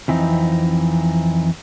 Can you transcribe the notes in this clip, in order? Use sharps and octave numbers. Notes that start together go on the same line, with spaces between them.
F2 E3 C4 D#4